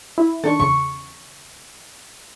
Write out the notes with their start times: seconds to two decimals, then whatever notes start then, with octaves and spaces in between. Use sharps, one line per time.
0.18 E4
0.44 D#3 D4 A4 C#6
0.60 E2 C#3 C#6